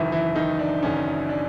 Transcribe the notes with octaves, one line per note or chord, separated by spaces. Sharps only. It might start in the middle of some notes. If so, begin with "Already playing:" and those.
Already playing: F#1 F#2 D#3 E3 E4
E3 E4
D#3 D#4
D4
F#1 F#2 D#3 C#4
D4